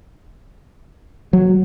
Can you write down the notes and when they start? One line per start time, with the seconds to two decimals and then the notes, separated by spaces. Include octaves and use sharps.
1.33 F#3